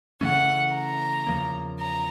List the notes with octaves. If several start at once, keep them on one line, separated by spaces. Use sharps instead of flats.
C#3 E3 A3 C#4 F#5
A#5
E2 C#3 F3 A#3
A#5